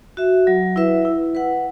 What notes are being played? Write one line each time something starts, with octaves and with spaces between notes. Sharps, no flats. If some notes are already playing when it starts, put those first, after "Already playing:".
F#4 E5
F#3
E4 B4 E5
E4
B4 F#5